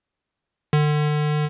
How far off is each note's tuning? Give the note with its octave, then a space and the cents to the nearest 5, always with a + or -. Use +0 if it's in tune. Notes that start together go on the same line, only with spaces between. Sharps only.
D3 +35